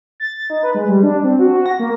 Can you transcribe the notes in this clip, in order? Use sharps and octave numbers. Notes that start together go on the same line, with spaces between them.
A6
A6
D#4
B4
G#3
G3
D4
C4
F#4
F#4
A#6
A#3